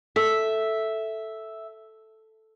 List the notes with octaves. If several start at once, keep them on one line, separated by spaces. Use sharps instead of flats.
A4 E5